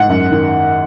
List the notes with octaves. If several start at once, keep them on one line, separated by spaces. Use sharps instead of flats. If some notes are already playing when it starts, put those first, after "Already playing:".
Already playing: G#2 F#5
F#2
D#3